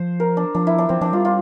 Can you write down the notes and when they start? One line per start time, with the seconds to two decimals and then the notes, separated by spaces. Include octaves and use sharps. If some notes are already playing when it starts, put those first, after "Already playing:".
Already playing: F3 C5
0.20 A#4
0.37 D4
0.55 F3 D4
0.67 E4
0.78 D4
0.89 F3 C4
1.01 F3 D4
1.13 G3 F4
1.25 F4